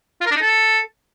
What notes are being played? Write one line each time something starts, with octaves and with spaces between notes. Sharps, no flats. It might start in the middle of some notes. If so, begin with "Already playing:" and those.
F4
A#4
D4
D#4
A4